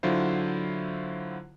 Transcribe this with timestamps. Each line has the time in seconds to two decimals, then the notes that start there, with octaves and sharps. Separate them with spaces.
0.03 D3 F#3 E4 F4 C5